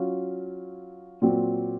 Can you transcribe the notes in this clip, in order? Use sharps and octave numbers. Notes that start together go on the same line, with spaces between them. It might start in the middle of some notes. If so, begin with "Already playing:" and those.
Already playing: F#3 C#4 F4
A#2 F#3 C4